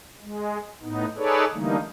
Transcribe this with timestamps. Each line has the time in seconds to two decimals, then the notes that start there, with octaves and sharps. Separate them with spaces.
0.22 G#3
0.82 A2 B3 D#4
1.17 D#4 G#4 A4 B4 C#5 D5
1.54 D3 E3 G3 A3 A#3 D#4